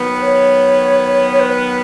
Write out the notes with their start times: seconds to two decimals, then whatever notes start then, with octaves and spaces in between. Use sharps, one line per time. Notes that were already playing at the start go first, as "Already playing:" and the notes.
Already playing: D#3 F#3 B3
0.14 B4
0.22 C#5
1.32 C#5
1.40 B4